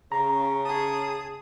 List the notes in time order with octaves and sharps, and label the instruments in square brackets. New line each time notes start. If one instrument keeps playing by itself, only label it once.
[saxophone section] C#3 [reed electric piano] A#5
[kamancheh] G#4 D#6 [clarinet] A5